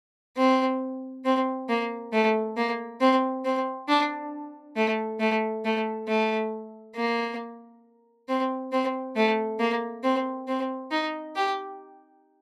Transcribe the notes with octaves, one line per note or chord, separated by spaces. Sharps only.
C4
C4
A#3
A3
A#3
C4
C4
D4
A3
A3
A3
A3
A#3
C4
C4
A3
A#3
C4
C4
D#4
G4